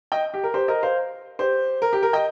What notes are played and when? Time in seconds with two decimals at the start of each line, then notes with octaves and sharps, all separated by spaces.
0.12 D#5 G5
0.34 G4
0.43 A#4
0.54 G4 C5
0.68 A#4 D#5
0.83 C5 F5
1.39 G4 C5
1.82 A#4
1.93 G4
2.03 A#4
2.13 D#5 G5